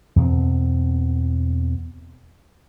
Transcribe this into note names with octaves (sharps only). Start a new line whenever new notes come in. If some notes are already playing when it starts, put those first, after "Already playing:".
E2 B2 B3 C4